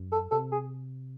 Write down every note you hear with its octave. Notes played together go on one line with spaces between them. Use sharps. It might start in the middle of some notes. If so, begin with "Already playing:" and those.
Already playing: F#2
A4
C3 A4
G#4